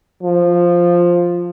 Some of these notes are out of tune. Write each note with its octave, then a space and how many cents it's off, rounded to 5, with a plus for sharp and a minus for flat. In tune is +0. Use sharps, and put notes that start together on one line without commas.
F3 +0